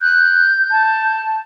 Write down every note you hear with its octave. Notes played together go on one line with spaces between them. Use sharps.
F#6 G6
A5